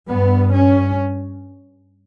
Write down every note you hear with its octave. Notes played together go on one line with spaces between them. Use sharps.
G2 B3
C#4